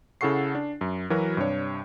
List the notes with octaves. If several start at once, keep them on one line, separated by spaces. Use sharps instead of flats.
C#3 E4 A4 F#5 C#6 C7
D4
F#2
E3 F#3 F#4 A#4 B4
G2 C3 D4 C#5